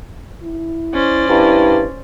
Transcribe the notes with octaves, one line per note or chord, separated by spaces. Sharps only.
E4
C#4 C5 D5
G2 E4